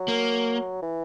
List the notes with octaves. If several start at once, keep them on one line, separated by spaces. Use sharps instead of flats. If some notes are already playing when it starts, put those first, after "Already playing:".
Already playing: F#3
A#3
E3